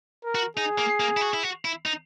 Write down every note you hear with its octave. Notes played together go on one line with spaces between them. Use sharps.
A#4
F#4
D#4 G#4
A#3
A#3
E4
F#4
E4
F#4
E4
D#4